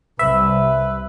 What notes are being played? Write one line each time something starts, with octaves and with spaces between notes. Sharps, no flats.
C2 B4 E5